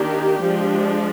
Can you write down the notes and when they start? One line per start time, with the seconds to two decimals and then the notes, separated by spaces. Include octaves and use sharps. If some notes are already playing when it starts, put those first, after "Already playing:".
Already playing: D#3 A#3 D4 G4
0.41 F3 G#3 D4